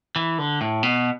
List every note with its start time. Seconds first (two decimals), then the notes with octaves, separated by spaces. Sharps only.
0.16 E3
0.38 D3
0.61 A2
0.83 B2